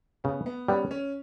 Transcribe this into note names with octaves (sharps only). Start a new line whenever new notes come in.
C#3 B3
B3
G3 B3 C#4
C#4